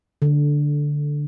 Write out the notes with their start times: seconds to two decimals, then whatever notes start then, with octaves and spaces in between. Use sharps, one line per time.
0.22 D3